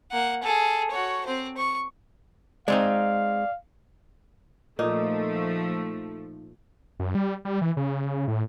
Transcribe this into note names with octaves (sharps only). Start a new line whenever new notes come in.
A#3 F#5
G#4 A4
F#4 C#5
C4 C5
C#6
G#3 C4 D#4 D5 F5
A#2 F3 A3 D#4
F#2
G3
G3
E3
C#3
A2